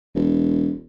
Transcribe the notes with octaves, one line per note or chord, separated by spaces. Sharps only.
E1